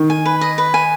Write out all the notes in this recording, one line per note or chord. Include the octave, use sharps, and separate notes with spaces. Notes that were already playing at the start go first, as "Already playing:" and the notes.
Already playing: D#3
G#5
B4
D#5
B4
G#5